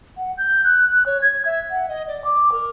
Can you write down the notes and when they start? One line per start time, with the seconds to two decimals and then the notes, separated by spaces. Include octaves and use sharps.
0.17 F#5
0.38 G6
0.64 F#6
0.88 F#6
1.06 C#5
1.21 G#6
1.45 E5
1.70 F#5
1.88 D#5
2.07 D5
2.24 D6
2.52 A#4